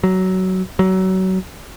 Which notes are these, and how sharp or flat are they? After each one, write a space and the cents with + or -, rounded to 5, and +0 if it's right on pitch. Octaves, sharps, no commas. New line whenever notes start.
F#3 +15
F#3 +25